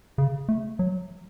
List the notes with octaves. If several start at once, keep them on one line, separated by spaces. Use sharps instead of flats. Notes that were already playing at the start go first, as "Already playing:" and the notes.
C#3
A3
F#3